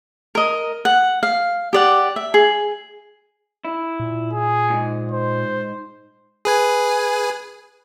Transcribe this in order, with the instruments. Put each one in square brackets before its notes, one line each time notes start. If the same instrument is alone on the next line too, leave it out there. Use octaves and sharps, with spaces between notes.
[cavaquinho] A#4 D#5
F#5
F5
G4 D5 F#5
E5
G#4
[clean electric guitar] E4
[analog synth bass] A#2
[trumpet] G#4
[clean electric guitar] D2 G#2
[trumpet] C5
[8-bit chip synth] G#4 B4 G#5